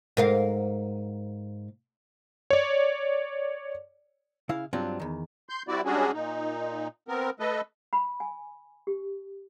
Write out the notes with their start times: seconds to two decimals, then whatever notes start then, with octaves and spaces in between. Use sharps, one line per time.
0.17 G#2 A#4 F5
2.50 C#5 D5
4.49 C#3 E4 F5
4.73 G2 F#3 C4 D4 F4
5.00 E2 D#3
5.49 C6 G6
5.68 G3 C4 E4 F#4 D5
5.85 G3 G#3 C#4 D4 F#4 G#4
6.13 A#2 D#4
7.08 B3 C4 A#4
7.40 A3 A4 B4 D#5
7.93 B5
8.20 G#5
8.87 G4